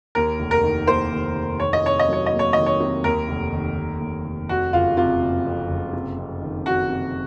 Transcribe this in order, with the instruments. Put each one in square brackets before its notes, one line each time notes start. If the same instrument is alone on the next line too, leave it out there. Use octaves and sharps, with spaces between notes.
[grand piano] D#2 [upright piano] A#4
[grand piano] F1
[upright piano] A#4
[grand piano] D#3
[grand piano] A#3 [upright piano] C5
[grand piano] D#2
F1
[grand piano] D#3 [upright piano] C#5
[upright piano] D#5
[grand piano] C3 [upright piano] C#5
[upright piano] D#5
[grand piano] F#3 [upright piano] C#5
[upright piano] D#5
[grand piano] A#3
[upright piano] C#5
[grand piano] D#3 [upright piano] D#5
[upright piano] C#5
[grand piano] C3
[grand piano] D#2 [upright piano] A#4
[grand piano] F1
D#3
F1
D#2
F1
[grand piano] F2 [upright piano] F#4
[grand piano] F#1 [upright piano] F4
[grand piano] C3 [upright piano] F4
[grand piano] F#1
F2
F#1
C3
F2
D#3
[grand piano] F2 [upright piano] F#4
[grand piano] C3